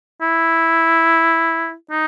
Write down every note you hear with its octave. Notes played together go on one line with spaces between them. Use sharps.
E4
D#4